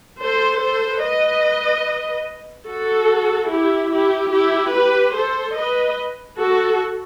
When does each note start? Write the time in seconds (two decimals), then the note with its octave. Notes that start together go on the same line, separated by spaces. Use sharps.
0.20 A4 C5
0.62 A4 C5
1.03 B4 D#5
2.68 F#4 A4
3.50 E4 G4
3.92 E4 G4
4.32 E4 G4
4.73 G4 B4
5.15 A4 C5
5.56 B4 D#5
6.38 F#4 A4